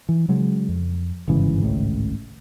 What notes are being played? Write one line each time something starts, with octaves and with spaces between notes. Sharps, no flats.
E3
C#3 F#3 G#3
F2
G1 G#2 C#3 E3
G#1 C#2 A2 C#3